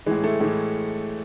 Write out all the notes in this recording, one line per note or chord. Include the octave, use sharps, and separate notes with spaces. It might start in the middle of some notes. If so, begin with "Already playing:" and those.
A2 E3 G#3
A3
A2 E3 G#3